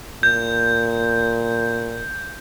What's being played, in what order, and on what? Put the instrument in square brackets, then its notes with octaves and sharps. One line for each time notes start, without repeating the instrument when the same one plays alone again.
[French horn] A#2 [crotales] G6